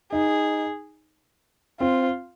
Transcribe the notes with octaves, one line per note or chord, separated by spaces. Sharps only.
D#4 G#4
C4 F4